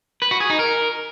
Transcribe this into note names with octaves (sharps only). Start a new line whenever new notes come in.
B4
F#4
G#4
D#4
A#4